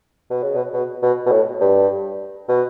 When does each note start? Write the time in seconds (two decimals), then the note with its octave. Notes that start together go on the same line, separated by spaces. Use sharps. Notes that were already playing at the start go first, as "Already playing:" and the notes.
0.30 B2
0.43 C#3
0.56 B2
0.74 B2
1.03 B2
1.26 B2
1.32 A2
1.61 G2
2.49 B2